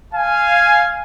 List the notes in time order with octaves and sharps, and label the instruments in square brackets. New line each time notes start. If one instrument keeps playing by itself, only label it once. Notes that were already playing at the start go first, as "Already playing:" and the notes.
[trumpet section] F5 G#5